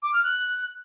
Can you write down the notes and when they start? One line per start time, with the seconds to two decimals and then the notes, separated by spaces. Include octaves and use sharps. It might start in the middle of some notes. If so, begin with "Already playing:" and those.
0.02 D6
0.13 F6
0.24 F#6